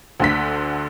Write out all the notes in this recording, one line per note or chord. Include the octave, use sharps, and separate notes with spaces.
D2 D3 B6